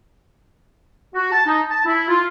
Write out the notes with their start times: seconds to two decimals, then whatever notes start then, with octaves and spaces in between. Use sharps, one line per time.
1.15 F#4
1.32 A5
1.46 D#4
1.70 A5
1.85 E4
2.09 F4